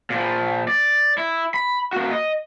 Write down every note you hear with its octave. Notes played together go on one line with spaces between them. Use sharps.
A#2 F3
D5
E4
B5
A#3 F#4
D#5